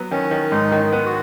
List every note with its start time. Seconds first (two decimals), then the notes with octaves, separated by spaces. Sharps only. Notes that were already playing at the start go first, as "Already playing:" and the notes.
Already playing: F#3 B3
0.11 D#3 C#4
0.31 D#3
0.51 G#2 D#4
0.72 D#3
0.92 B3
1.06 F#4